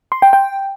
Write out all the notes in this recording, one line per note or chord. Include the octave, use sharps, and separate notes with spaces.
C6
G5
G5